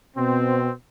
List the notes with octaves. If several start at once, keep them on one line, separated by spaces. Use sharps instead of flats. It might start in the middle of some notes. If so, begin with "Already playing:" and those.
B2 C4